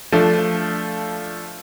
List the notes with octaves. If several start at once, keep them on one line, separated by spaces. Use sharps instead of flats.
F3 A3 D4